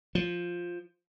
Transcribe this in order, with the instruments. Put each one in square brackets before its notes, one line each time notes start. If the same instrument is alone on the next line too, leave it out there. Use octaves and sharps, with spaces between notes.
[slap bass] F3